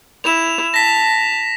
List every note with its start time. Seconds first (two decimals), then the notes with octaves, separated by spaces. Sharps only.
0.24 E4 E7 F7
0.74 A5 A#6 B6